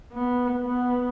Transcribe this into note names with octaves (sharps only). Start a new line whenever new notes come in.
B3
B3